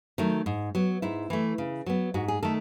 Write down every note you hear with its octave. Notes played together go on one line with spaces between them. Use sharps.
D#3 F#3 A3
G#2
F#3 B3
G#2 E4
E3 A3
C#3
F#3 B3
G#2 F#4
G#4
D#3 A3 A4